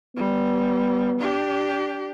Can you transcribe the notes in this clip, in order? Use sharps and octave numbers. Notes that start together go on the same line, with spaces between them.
G3 B3
D4 G4